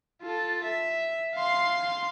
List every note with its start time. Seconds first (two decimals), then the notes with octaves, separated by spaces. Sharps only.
0.22 F4 A4
0.64 E5
1.35 F5 C6